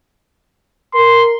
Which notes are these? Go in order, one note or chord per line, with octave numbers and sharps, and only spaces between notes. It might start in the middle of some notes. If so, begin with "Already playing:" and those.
A#4 C6